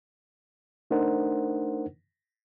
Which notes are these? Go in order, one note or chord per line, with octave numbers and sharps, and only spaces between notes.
A3 D4 D#4 A#4 C5 F#5